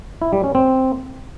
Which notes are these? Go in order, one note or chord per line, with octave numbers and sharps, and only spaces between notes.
E4
G3
C#4
C4